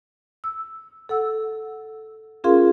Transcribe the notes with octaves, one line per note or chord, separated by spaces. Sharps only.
E6
A4 F#5 E6
C#4 F4 G#4 A#4 F5 C6